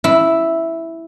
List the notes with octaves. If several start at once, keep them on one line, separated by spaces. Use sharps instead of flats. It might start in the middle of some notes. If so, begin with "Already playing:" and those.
E4